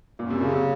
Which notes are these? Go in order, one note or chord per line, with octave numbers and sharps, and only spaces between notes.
F#2 A#2
C3
A#2 C#3
C3